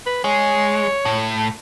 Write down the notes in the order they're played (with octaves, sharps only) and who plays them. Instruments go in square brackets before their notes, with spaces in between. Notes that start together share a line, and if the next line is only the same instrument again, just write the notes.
[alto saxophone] B4
[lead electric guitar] G#3 [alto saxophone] C#5
[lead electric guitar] A2